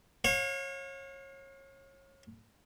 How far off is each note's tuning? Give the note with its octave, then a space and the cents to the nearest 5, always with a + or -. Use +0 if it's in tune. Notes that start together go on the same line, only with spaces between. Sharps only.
C#5 -30 F5 +35